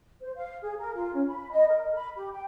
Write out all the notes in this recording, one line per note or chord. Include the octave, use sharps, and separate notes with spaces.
C5
F5
G#4
A#4
F4
C#4
B5
D#5
A#4
B5
G4
G5